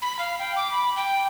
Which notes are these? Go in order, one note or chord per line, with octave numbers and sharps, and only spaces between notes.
B5
F5
G5
D6
B5
G5